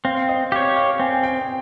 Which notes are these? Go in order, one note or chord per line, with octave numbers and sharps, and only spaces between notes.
C4 F5
D#5
G4 C#5 F5
F5
C4 G#5
G#5
G5